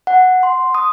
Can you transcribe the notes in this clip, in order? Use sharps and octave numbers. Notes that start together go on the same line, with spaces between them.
F#5
C6
D#6